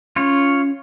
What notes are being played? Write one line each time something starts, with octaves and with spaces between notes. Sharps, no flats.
C#4 F4 C#5